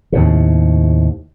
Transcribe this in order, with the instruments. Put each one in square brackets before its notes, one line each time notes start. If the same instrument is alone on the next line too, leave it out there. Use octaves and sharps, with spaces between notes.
[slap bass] D#2 A2 C3